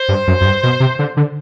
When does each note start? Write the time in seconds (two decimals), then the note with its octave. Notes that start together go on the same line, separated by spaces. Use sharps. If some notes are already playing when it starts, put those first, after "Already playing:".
Already playing: C5
0.09 G2
0.27 F#2
0.41 F#2
0.45 G2
0.63 B2
0.80 C3
0.99 D3
1.17 D3